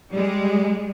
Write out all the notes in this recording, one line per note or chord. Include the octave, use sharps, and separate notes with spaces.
G3 G#3